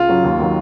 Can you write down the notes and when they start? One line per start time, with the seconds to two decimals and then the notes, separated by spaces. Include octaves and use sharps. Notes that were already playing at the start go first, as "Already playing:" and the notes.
Already playing: C#2 F4
0.08 C#3 F#3
0.24 D#2
0.39 D#3 F#3